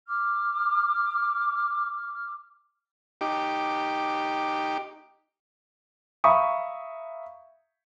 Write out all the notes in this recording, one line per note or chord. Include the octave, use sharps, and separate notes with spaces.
D6 F6
D#4 G4 D6
E5 F5 A#5 B5 C#6 D#6